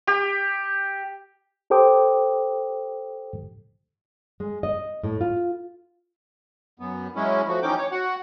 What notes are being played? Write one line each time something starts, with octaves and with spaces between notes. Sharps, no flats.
G4
G4 A4 C5 G5 D6 D#6
G#3
D#5
A2
F4
F#2 B3
F#3 G#3 C#4 E4
F3 A3 F#4
E3 C#4 D#4 G5 D6
C#5
F#4 F#5